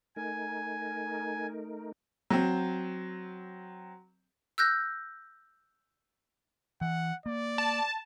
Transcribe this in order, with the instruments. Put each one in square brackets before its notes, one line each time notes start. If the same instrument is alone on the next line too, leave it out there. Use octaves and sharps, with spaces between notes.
[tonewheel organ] A3 D#4 A#4 [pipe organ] G#5
[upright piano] F#3 C4
[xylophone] E6 F#6 G6 A#6
[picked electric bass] E3 [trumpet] F#5
[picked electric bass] A#3 [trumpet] D5
[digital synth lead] A5